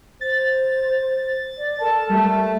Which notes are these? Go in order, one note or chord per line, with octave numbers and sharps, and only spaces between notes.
C5 A6
D5
A4 A#4 A5
G3 A3